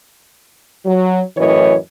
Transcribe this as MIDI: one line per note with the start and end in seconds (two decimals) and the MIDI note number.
0.85 1.21 54
1.37 1.75 42
1.37 1.75 45
1.37 1.75 52
1.37 1.75 73
1.37 1.75 75